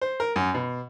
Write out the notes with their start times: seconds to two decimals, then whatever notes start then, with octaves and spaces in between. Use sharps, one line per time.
0.02 C5
0.20 A#4
0.36 F#2
0.54 B2